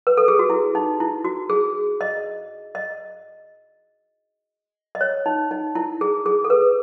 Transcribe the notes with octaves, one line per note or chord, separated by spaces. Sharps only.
B4
A4
G#4
F#4
E4
D#4
E4
F#4
G#4
D#5
D#5
D#5
C#5
D#4
D#4
E4
G#4
G#4
A4
B4